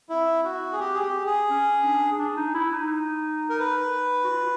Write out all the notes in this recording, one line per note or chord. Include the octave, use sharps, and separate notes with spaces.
C4 E4
F#4
G#4
G4
G#4
G4
G#4
C#4
D4
D4
D#4
E4
D#4
A#4
B4
F#4
F4